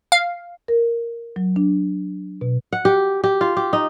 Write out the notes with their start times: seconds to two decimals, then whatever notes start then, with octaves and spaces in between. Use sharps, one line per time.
0.12 F5
0.68 A#4
1.36 F#3
1.56 D4
2.41 B2
2.73 F#5
2.85 G4
3.24 G4
3.41 F4
3.57 G4
3.73 D#4